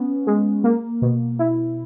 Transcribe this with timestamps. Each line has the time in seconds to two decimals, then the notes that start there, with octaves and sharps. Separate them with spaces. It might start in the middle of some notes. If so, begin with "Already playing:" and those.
Already playing: B3 C#4
0.27 G#3
0.64 A#3
1.02 B2
1.39 E4